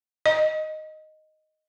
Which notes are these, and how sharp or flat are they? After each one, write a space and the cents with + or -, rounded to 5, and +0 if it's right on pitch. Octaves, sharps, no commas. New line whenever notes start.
D#5 +0